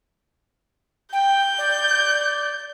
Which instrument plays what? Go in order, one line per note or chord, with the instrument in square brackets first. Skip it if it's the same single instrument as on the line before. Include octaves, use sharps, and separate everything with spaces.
[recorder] G5 [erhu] G6
[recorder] D5